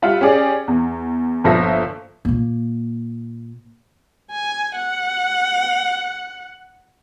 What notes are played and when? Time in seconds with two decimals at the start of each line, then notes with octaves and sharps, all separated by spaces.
0.02 G3 F4 E5 F#5
0.21 C#4 G4 G#4 D5
0.68 E2
1.44 G1 A#2 F3 A4 E5 A#6
2.25 A#2 A#3
4.31 G#5
4.76 F#5